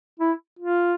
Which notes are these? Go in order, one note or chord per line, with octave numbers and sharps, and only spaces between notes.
E4
F4